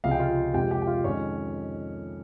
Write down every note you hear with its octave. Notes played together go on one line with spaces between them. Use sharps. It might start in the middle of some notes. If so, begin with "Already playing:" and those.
C#2 C3 F3 G#3 F5
G5
F4 F5
F2 C3 F3 G#3 G4 G5
G4 G5
G5
F4 F5
F2 D#3 G#3 C#4 C#5